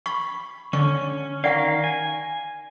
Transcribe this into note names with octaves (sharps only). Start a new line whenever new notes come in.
B5 C#6
D3 C#4 C#6
D#3 A#4 D5 F5 F#5 C#6
G#5